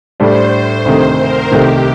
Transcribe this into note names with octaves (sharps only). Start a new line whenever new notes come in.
A2 G3 D4 C5
D2 C3 D#3 A3 C5
A#4
C2 C3 D#3 A3 G4